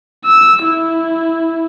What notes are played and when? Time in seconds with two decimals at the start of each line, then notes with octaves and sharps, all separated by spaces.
0.25 E6
0.63 E4